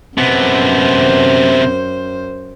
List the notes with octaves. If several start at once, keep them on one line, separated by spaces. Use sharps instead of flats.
F#2 C3 B3 C5